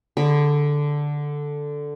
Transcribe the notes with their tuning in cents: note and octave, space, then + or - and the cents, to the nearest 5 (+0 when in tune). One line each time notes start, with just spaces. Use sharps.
D3 +0 G#4 -30 B5 +0